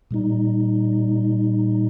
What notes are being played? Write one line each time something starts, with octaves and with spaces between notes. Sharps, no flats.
A#2 G3 D#4